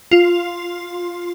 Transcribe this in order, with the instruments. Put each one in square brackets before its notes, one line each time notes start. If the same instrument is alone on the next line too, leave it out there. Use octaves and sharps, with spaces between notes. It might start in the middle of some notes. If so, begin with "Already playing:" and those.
[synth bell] F4